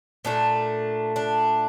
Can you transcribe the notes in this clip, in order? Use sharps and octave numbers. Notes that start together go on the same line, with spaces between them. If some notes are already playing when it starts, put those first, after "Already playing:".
A#2 A3 D4
D4